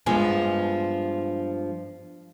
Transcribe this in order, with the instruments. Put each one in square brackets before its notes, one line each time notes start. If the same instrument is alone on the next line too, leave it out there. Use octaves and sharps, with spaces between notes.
[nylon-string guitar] G2 F3 G#3 B3 G#5